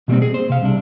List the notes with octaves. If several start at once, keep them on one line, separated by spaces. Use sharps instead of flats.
B2 F3 G3 A3 A#3 C4
G#4
C5
C3 F5
C2 C3 D4